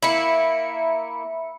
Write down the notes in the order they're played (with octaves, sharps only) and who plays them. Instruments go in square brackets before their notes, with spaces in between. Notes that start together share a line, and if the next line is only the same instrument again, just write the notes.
[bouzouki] A#3 E4 [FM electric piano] E5 B5 C#7